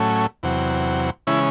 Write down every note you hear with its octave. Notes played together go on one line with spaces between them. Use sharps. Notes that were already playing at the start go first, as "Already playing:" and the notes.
Already playing: A2 F#3 A3 C#4
E2 C3 F#3
C#3 E3 G#3 C#4 E4